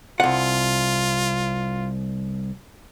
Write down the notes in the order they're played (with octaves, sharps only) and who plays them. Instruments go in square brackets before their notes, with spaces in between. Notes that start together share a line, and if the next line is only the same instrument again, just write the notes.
[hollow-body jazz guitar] C2 F#5 [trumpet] F4